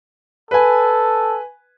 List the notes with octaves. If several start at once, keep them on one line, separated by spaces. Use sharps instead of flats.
A4 B4 G#5